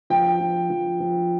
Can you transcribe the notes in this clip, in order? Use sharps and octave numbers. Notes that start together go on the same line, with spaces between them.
F3 G5
F3
F3
F3